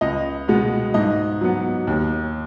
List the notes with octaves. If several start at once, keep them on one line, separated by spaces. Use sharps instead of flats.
C#2 D#5
B2 G#3 B3
G#2 D#5
F#3 B3
D#2